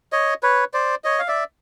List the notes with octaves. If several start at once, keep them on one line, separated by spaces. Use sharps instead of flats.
C#5 D#5
B4 C#5
C5 D5
C#5 D#5
F5
D5 E5